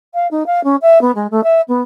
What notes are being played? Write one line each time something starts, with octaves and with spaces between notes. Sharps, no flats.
F5
D#4
F5
C#4
E5
B3
G#3
A3
E5
B3